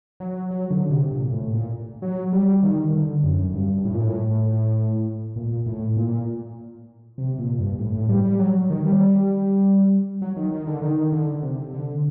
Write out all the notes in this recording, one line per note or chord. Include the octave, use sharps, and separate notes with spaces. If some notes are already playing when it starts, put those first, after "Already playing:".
F#3
F#3
D3
C3
A#2
A2
A#2
F#3
G3
D#3
D3
F#2
G2
A2
A#2
A2
A#2
A2
A#2
C3
A#2
G2
A2
A2
G3
G3
F#3
D#3
G3
F#3
D#3
D#3
D3
D#3
D3
C3
D3